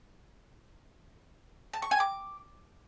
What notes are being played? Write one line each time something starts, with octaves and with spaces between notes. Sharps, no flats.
A5
C#6
G#5
D6